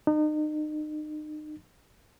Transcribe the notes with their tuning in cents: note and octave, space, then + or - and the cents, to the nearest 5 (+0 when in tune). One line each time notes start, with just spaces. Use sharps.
D#4 -35